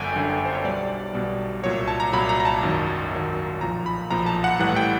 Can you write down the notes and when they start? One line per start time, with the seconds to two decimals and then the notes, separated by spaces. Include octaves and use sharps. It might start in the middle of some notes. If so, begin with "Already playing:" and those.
Already playing: G1 F#2 D3 G5 G#5
0.15 G1 F#2 D3
0.46 C5
0.55 C#5
0.64 B1 B2 G3 D5
1.13 B1 B2 G3
1.63 C2 A#2 F#3 C#5
1.88 A5
2.00 A#5
2.13 C2 A#2 F#3 B5
2.29 A#5
2.40 A#5
2.45 A5
2.63 G#1 F#2 D#3 F#3
3.11 G#1 F#2 D#3 F#3
3.61 B1 A#2 F3 A#5
3.86 B5
4.10 B1 A#2 F3 A#5
4.26 A5
4.44 F#5
4.59 A1 A2 E3 G3 F#5
4.76 G5